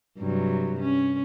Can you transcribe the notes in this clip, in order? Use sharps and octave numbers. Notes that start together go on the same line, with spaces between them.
G2 C3 F#3
C#4